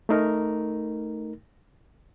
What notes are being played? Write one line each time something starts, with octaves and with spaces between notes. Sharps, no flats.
A3 D#4 A#4